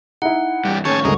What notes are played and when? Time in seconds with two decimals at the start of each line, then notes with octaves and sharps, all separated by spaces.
0.22 D#4 E4 F#5
0.65 G2 E3 G3
0.85 A2 D#3 C#4 G#4 C#5 A5 C#6
1.05 D2 G2 D3 G#3 D#4 A#4